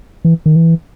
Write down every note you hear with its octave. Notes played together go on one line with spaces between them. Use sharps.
E3
D#3
E3